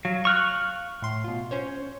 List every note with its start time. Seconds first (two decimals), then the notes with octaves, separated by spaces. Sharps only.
0.05 F#3 F5
0.25 C#6 F6 F#6
1.02 A2 C6
1.24 B2 F4
1.51 C#4 C5 C#5